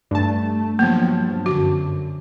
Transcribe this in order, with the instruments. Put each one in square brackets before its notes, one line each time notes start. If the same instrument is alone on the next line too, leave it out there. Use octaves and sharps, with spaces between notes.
[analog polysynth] G2 A5 [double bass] A3
[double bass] F3 F#3 [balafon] A#3 B3
[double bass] F#2 D3 [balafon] F#4